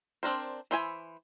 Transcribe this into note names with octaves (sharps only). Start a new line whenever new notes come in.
C4 D4 A#4 C5
E3 C5 E5 G#5 B5